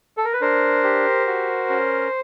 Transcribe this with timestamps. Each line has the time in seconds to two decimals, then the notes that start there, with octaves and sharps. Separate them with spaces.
0.17 A4
0.25 A#4
0.33 B4
0.41 D4 A#4 C5
0.84 G4
1.27 F#4
1.70 C#4